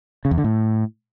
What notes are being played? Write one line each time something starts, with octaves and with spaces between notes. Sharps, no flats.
C#3
E2
D3
A2